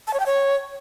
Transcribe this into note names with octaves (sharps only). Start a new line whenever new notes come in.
A5
C#5
G5
C#5